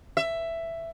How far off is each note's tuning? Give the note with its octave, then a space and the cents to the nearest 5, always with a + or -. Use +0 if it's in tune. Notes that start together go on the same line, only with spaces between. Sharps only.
E5 +10